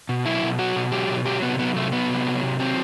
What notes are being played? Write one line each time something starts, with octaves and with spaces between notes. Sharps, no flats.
B2
F#3 E4
B2
F#3 F#4
B2
F#3 G4
B2
F#3 G4
C3 B3
F#3 B3
C3 A3
F#3 B3
C3
F#3
C3
F#3 C4